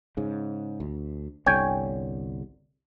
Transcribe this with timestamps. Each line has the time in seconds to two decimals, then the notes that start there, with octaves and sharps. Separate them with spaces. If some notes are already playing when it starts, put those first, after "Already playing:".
0.17 G#2 C#3
0.80 D2
1.46 G1 C2 D3 C#5 G5 G#5